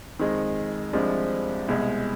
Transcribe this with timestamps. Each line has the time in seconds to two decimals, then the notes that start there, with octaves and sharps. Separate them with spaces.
0.19 F2 D#3 G#3
0.93 C2 C3 F3 G#3 D4
1.68 C2 B2 G#3